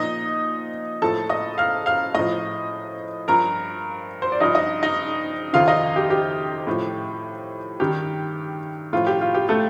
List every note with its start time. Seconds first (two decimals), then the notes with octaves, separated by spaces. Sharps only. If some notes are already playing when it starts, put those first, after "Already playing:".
Already playing: A#2 F3 D#4 D#5
1.02 A2 F3 A4 A5
1.29 D#5 D#6
1.58 F5 F6
1.86 F5 F6
2.14 A2 F3 D#5 D#6
3.28 G2 F3 A#4 A#5
4.22 C5
4.32 D5
4.40 G2 F3 D#4 D#5
4.55 D#4 D#5
4.83 D#4 D#5
5.53 F2 C3 D#3 F4 F5
5.68 D#4 D#5
5.96 G4
6.10 G4
6.67 A2 F3
7.80 G2 D#3 G4
8.93 A2 F3 F4
9.07 G4
9.21 F4
9.34 G4
9.49 A3 A4